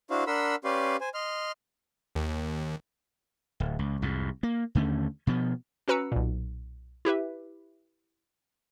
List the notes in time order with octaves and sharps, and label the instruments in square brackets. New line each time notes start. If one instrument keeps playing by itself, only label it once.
[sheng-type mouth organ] D4 E4 F#4 C5 F5
D4 A#4 F#5 B5 C6 E6
C#4 G4 B4 D5 F5 C6
C5 G#5
D#5 C6 F6
[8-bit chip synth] D#2
[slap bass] D1
C#2
C2 F2 G#2
A#3
D#2 D3 A3 C#4
B2 F3 B3
[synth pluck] C#4 F#4 B4 A#5 E6 C#7
B1 A#2
E4 G4 B4 E5